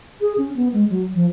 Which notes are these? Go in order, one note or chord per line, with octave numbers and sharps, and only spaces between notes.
G#4
C#4
B3
G#3
F#3
F3